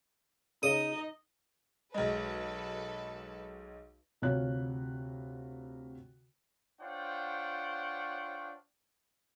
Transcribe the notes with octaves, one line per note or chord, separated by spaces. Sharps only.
C#3 D#4 D#5 D#6
B1 G#3 A4 B4
D2 C3 F4 C#5 F#6
D4 F4 C5 C#5 F#5 G5